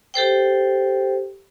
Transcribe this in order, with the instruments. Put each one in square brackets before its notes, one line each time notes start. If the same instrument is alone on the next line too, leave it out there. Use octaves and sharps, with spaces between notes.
[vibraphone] G4 A4 C5 G5